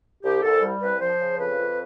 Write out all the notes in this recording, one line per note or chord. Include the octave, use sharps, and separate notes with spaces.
C2 G4
C2 A4
G3
C2 B4
F3 C5
C#3
F2 B4
F2